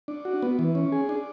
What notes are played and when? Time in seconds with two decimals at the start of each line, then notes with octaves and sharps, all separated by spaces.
0.08 D4
0.25 F#4
0.42 B3
0.59 E3
0.75 C#4
0.92 G#4
1.09 D4